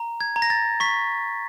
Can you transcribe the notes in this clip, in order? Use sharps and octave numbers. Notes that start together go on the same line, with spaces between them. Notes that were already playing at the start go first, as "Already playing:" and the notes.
Already playing: A#5
G#6
A#5
A#6
A6
C#6 B6